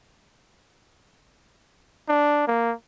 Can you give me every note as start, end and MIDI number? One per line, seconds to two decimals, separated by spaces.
2.08 2.47 62
2.47 2.73 58